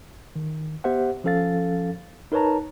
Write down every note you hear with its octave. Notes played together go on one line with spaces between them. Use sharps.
D#3
B3 G4 C5 E5 F#5
F3 C#4 A4 F5 A6
D#4 A#4 B4 C#5 A5 A#5